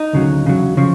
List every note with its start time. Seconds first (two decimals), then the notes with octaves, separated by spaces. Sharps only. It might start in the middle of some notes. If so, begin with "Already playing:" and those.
Already playing: D#4
0.13 D2 C#3 F#3
0.46 E2 C#3 F#3
0.77 C#3 F3